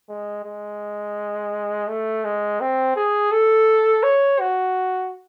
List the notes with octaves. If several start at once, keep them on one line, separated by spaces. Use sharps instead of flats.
G#3
G#3
A3
G#3
C4
G#4
A4
C#5
F#4